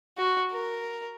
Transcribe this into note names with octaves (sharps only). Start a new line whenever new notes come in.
F#4
A#4